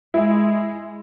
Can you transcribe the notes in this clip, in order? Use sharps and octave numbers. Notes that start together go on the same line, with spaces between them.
G#3 E4 E5